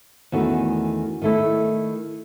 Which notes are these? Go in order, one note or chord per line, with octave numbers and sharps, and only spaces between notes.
E2 D#3 A3 C#4 F#4
D#3 A3 E4